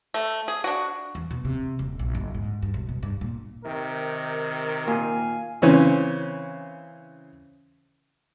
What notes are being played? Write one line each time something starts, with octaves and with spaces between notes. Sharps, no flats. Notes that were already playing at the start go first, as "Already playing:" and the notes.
A3
G#4
D4 F#4
E2
B2
C3
D#1
A#1
F#1
G#2
G2
B1
B2
G2
A#2
C3 D#3 A#4
A#2 F5 G#5
C#3 E3 C4 C#4